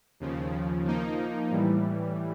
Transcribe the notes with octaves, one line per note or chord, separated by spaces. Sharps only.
D#2 C#3 F3
F3 A#3 D#4
A2 E3 G3